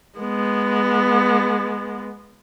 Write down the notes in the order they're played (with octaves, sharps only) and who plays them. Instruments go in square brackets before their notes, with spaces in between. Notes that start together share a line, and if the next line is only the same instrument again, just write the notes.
[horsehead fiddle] G#3 B3